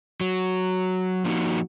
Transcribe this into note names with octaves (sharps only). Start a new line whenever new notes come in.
F#3
F3 A#3 C#4 D#4 F#4